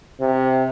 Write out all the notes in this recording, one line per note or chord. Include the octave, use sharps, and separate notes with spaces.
C3